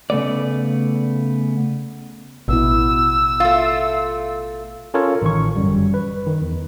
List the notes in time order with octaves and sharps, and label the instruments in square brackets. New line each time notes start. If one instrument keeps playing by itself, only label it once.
[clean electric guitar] C#3 A3 B3 D5
[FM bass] A1 [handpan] B2 B3 E4 [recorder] E6
[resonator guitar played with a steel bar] A3 F4 [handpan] F5
[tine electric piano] C#4 F4 A4 A#4 C#5
A1 D#3 C#6
G1 F#2 G3
B4
D#3
E2